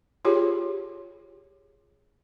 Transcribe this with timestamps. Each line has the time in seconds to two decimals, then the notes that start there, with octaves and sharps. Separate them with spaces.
0.25 F4 G4 G#4 C#5